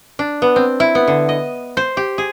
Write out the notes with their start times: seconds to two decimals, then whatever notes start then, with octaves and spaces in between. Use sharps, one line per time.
0.19 D4
0.42 B3
0.56 C4
0.80 E4
0.95 B3
1.08 D3
1.29 D#5
1.77 C5
1.97 G4
2.18 G#4